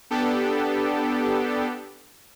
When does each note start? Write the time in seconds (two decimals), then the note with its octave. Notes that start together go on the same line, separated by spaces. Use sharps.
0.10 B3 D4 G4 A4